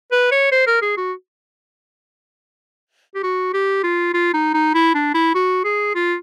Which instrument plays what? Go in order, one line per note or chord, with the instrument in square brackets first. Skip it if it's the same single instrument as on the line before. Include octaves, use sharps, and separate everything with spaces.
[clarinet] B4
C#5
C5
A#4
G#4
F#4
G4
F#4
G4
F4
F4
D#4
D#4
E4
D4
E4
F#4
G#4
F4